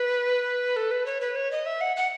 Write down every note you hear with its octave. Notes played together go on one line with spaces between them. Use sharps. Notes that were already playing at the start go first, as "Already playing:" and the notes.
Already playing: B4
A4
B4
C#5
B4
C#5
D#5
E5
F#5
F#5